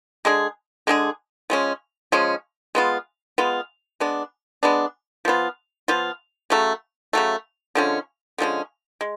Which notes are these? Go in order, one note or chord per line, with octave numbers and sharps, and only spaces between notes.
D3 G#3 D4 G#4
D3 G#3 D4 G#4
F3 G#3 C#4
F3 G#3 C#4
G#3 B3 F4
G#3 B3 F4
G#3 B3 D4
G#3 B3 D4
F3 B3 F4
F3 B3 F4
C#3 F#3 A3
C#3 F#3 A3
D3 F3 G#3 C#4
D3 F3 G#3 C#4
G#3